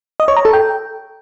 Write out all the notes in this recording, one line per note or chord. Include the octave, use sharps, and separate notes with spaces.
D#5
C#5
A#5
A4
G5